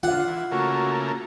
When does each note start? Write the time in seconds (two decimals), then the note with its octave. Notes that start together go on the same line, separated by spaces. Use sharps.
0.03 D3 F4 F5 F#5
0.27 E3
0.52 C#3 A3 A#3 F#4